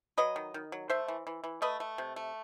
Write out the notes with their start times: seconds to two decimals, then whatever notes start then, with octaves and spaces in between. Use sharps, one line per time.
0.18 F#3 B4 D#5
0.36 D#3
0.54 D#3
0.72 F#3
0.90 A3 C5 E5
1.08 E3
1.27 E3
1.44 E3
1.62 A3 B4 D#5
1.80 A3
1.98 C3
2.16 A3